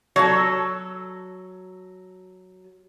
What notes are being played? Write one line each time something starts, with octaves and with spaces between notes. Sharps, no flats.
F#3 A4